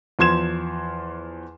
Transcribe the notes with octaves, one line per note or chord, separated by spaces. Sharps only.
E2 F3 C6 G#6 E7